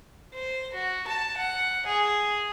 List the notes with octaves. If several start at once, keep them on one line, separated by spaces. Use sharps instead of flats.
C5
F#4
A5
F#5
G#4